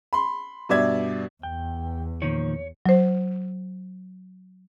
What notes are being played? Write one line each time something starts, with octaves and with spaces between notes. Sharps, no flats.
B5 C6
G2 B2 D5 E5 G#6
E2 G5
A#2 D#3 F3 C#5
F#3 C5